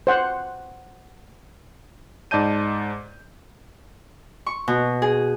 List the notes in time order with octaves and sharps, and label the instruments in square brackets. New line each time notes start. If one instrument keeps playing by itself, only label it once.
[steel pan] C5 F#5
[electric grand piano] G#2 D5 D#5 A5 G6 D#7
[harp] C#6
B2
G#4